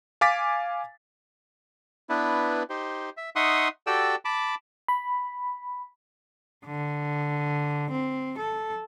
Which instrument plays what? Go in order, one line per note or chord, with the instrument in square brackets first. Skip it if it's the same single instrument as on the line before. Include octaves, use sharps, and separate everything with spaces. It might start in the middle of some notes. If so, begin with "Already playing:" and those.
[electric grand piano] F5 G#5 D6 A6 B6
[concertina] B3 D4 E4 B4
D#4 G4 C5
E5
D#4 E5 F#5 C6 C#6 D#6
F#4 G4 A4 D5 G5 E6
A5 B5 D6
[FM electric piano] B5
[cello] D3
C4
A4